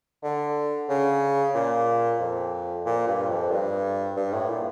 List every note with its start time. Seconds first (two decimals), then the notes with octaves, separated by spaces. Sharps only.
0.23 D3
0.89 C#3
1.54 A#2
2.20 F2
2.86 A#2
3.07 G2
3.29 F2
3.51 G2
4.16 G2
4.33 A2
4.49 A#2